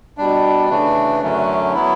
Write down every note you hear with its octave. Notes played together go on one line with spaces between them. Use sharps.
B2 G3 D4
C#3 E3 A3 D4
F#2 D3 F#3 A3 C#4
F#3 B3 E4